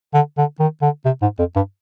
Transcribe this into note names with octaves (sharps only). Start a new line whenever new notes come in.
D3
D3
D#3
D3
C3
G#2
F2
G2